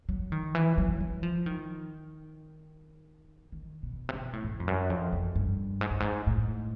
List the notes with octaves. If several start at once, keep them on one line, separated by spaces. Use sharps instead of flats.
F#3
D#3
E3
F#3
F#3
F3
D#3
D#3
B2
C3
B2
A2
G#2
F2
F#2
F2
F2
G2
G#2
G2
G#2
A2